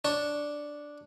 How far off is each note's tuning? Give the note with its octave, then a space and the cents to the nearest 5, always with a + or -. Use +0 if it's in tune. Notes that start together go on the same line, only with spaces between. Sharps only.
D4 +0 C#5 +0